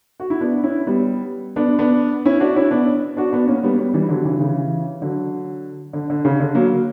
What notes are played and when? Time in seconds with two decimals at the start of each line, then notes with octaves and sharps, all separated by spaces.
0.20 F#4
0.30 E4
0.41 B3 D4
0.63 C#4 E4
0.87 G3 B3
1.56 B3 D4
1.79 B3 D4
2.25 C#4 E4
2.40 D4 F#4
2.56 C#4 E4
2.71 B3 D4
3.17 D4 F#4
3.32 B3 D4
3.48 A#3 C#4
3.63 G3 B3
3.78 G3 B3
3.94 E3 G3
4.09 D3 F#3
4.25 C#3 E3
4.40 C#3 E3
5.01 D3 F#3
5.93 D3
6.10 D3
6.25 C#3
6.40 D3
6.55 F#3 A#3